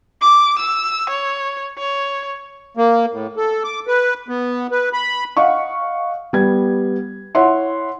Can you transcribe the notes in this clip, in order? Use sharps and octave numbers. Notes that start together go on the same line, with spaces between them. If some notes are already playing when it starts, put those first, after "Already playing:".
D6
E6
C#5
C#5
A#3
A2
A4
D6
B4
B3
B4
B5
D#5 F5 F#5 C#6
G3 B3 G#6
E4 C#5 E5 F#5 C6